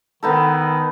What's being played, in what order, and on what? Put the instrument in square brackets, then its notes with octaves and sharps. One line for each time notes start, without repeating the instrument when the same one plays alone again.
[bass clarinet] D#3 [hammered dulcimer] B3 D#4 A4